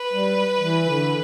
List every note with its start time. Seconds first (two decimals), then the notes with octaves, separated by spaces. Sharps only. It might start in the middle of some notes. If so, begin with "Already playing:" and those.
Already playing: B4
0.13 G3
0.60 E3
0.86 D3